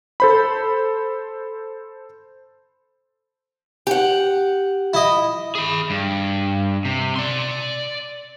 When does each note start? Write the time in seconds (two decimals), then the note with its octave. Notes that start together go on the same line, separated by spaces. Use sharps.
0.20 A4 C5 B5
3.87 G4 F#5
4.94 E4 D#5
5.55 G#4 B5
5.90 G2
6.85 C3
7.16 D5 C6